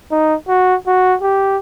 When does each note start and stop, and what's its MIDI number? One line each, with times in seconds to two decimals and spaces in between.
0.11 0.35 63
0.48 0.76 66
0.87 1.15 66
1.21 1.58 67